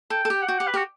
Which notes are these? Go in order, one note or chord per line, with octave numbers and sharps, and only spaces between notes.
A4 G5
A4
G4
F#5
F#4 G5
G4 F#5
B4
F#4 G4